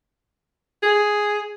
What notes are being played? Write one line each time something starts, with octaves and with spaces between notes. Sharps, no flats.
G#4